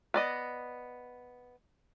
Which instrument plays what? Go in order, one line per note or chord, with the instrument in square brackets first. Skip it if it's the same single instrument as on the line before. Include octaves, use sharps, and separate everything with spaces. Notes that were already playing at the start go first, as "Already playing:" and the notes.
[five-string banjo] B3 D5 D#5